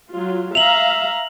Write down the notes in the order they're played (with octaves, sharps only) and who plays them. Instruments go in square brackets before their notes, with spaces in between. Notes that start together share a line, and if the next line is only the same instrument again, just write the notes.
[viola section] F#3 F4
[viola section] E5 F5 A#5 [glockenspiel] F7 F#7